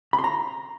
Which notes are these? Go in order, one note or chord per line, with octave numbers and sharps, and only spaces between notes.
B5
C6
A#5